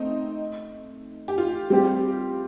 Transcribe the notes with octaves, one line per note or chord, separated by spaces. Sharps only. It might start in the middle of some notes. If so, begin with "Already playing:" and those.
Already playing: A3 C4 D#4
G4
F4
G3 C4 G4